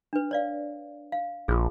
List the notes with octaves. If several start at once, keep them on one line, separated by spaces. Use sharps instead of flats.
D4 B4
C#5 D5 F5
F5
A#1 F4 G#4